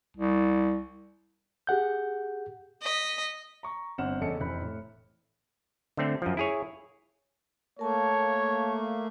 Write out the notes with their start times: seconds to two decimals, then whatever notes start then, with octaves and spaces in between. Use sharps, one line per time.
0.17 C2
1.67 G4 G#4 F#5 G6
2.82 D#5 B6
3.63 A#5 C#6
3.98 G1 C4 F#5 F6 E7
4.21 F#1 E2 C#4 A4 D#5 C#7
4.40 F1 E3 C4 B5 F#6
4.61 A2
5.97 D3 A3 C4
6.22 F#2 F3
6.37 E4 G#4 C#5
7.79 A3 A#3 A#4 C#5 A5